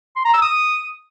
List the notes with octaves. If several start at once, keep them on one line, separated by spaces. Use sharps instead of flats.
C6
A#5
E6
D#6